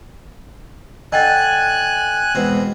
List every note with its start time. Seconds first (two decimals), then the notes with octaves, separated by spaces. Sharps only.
1.12 D3 D#5 G5 G#5 F#6 A6
2.35 E2 B2 G#3 C4